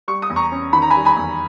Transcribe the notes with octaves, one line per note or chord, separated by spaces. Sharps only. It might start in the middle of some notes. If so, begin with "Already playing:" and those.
G3 C#6
D#6
E2
A#5 C#6
C#4
D#3 B5
A#5
G#5 B5
G3
G#5 B5
E2